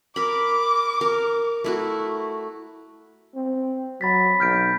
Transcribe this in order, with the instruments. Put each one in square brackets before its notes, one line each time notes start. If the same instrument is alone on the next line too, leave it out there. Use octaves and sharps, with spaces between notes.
[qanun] A#4 B5 [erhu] D6
[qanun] A#4
A3 E4 F#4
[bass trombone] C4
[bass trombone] F#3 [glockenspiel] B5 A6 B6
[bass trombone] B1 [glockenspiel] F6 G6 D7